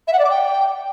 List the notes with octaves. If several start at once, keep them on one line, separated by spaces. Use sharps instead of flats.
E5
F#5
D5
D6
G5